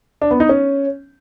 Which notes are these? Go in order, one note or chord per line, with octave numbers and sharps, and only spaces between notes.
D4
B3
D#4
C#4